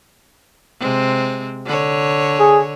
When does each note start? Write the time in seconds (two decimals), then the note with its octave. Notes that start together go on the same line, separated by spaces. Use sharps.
0.80 C3 G#3 C4
1.66 D3 C#5
2.39 G#4